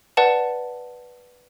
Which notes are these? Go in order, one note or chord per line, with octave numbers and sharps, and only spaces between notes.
B4 D5 F#5 A5